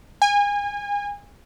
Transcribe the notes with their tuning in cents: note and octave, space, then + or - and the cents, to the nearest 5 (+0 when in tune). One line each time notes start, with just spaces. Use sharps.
G#5 -30